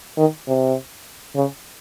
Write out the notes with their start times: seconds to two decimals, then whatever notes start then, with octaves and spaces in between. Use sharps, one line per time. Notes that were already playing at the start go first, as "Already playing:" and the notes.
0.17 D#3
0.47 C3
1.36 C#3